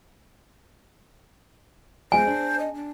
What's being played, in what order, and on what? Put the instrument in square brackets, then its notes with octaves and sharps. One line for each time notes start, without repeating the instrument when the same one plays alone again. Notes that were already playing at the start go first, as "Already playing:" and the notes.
[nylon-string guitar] G#3 B3 F4 [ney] C5 [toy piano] G#5
[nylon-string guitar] D4
[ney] D#5
D4